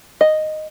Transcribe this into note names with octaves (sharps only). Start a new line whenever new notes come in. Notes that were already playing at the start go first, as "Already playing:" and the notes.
D#5